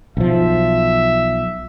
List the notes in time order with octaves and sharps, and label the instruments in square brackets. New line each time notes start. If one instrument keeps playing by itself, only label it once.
[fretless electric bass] B1 F3 [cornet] E5